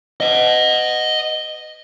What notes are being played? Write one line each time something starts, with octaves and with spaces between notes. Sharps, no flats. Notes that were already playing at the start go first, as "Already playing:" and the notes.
D#5 F#5